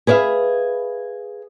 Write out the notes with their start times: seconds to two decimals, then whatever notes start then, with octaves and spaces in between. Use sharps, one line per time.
0.07 G#4 B4 D5 E5 F5